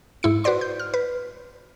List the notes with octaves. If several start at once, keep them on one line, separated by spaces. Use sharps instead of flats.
G#2 E4 C#7
F#4 B4 C5 D5 C6
G6
F6
B4